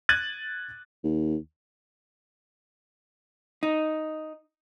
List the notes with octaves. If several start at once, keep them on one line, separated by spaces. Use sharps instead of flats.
F#6 G#6 A6 D#7 F#7
D#2
D#4